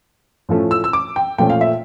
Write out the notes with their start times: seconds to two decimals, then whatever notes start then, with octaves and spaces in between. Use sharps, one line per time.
0.49 A2 F3 A3 C#4
0.71 E6
0.84 E6
0.93 D6
1.16 G5
1.38 A#2 F3 A3 C#4 G5
1.50 F5
1.61 E5